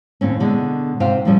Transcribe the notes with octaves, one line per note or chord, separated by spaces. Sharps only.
D#2 A2 C4 C#4
B2 D3 G#3 D4
G#2 C3 F4 C5 F5 G5
F2 A2 F3 G3 C#4